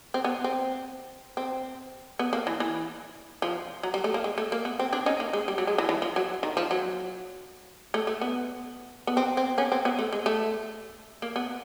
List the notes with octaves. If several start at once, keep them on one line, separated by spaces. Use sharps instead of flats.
C4
B3
C4
C4
B3
A#3
E3
E3
F3
F#3
G3
A3
A#3
G#3
A3
A#3
B3
C4
C4 D4
C#4 D#4
A#3
G#3
G3
F#3
G#3
E3
E3
F3
F#3
D#3
F3
F#3
A3
A3
B3
B3
C4
C4
B3 C#4
C4
B3
A3
G#3
A3
A#3
B3